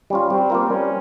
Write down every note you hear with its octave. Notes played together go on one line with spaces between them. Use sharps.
G3 C#4 F4
G3 C4
A#3 F4 A#4
G3 C#4